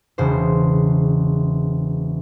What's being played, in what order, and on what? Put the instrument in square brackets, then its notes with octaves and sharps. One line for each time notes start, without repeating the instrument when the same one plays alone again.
[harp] E1 C#3 E3 C5